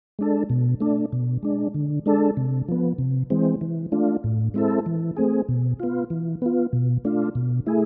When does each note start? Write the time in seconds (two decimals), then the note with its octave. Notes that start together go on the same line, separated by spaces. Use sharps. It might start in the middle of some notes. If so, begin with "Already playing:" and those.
0.19 G#3 D4 A4
0.50 B2
0.80 A3 D4
1.13 B2
1.43 G#3 D4
1.74 D3
2.06 G#3 D4 A4
2.37 C3
2.68 F3 B3
2.98 C3
3.30 E3 G#3 C4
3.61 E3
3.92 A3 D4 F4
4.24 A2
4.54 G#3 C4 E4 A4
4.86 E3
5.17 A3 C4 G#4
5.49 B2
5.80 B3 F4
6.10 E3
6.42 B3 F4
6.73 B2
7.05 A3 D4 F4
7.35 B2
7.66 A3 E4 G#4